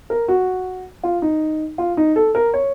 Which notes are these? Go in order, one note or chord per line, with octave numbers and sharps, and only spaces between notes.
A#4
F#4
F4
D#4
F4
D#4
A4
A#4
C#5